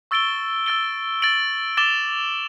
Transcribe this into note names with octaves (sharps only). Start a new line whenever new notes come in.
C#6 E6 A6 D7 G7
E6 A6 D7 G7
A6 D7 F#7
D6 A6 E7 G7